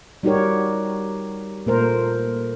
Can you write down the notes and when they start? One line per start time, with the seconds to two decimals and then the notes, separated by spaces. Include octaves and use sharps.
0.23 G3 D#4 F#4 G4 A#4 C#5
1.66 A#2 A3 A#4 C5